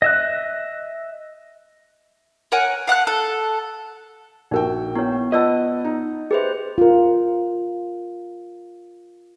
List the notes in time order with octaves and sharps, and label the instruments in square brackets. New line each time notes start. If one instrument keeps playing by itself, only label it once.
[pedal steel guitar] D#5 E5 F#6
[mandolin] A#4 C#5 F#5 G#5
F5 F#5 A5 F#6
A4
[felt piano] A#1 F#4 G5 [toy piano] D#4 A#4
[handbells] B3 [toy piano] E4 C#5
[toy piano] F4 D5 E6 [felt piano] B4 F#5 A5 [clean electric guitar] D#5
[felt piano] D#4
[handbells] G4 B4 C5 [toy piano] G#4 E5
[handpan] F4 A#4